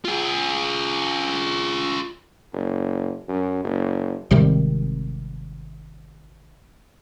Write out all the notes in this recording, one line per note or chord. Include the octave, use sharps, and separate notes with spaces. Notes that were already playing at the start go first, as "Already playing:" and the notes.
F4 G#4
F#1
F#2
F#1
G#1 C3 D#3 G3